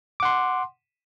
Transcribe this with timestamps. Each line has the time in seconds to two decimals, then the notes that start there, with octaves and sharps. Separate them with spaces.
0.20 D6
0.23 F#5
0.25 C6